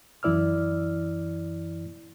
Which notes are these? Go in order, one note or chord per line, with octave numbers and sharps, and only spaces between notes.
F#2 E3 E4 D5 E6 F6